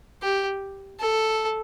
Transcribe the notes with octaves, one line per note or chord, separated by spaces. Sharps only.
G4
A4